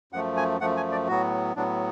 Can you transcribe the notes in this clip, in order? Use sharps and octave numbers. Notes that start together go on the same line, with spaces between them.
F#2 F3 A3 F#5
G#5
F#2 F3 A3 F#5
G#5
D5
A2 F#3 B3 F#4
A2 F#3 B3 D4